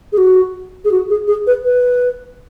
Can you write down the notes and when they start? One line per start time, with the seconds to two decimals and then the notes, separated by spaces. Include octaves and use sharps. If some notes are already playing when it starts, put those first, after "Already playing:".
0.12 G#4
0.18 F#4
0.85 G#4
0.92 F#4
1.10 G#4
1.28 G#4
1.47 B4
1.65 B4